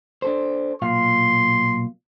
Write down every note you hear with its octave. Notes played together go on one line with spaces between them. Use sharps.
D4 A4 C5
B1 A#2 F5 C6